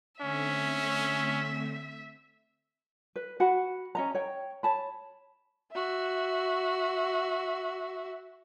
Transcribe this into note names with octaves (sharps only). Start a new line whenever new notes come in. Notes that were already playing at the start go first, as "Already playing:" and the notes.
D3 A3 C4 C#4 E5
B4
F#4 F#5 B5
C#4 D#5 A#5
C#5 G5
C#5 A5 B5
F#4 E5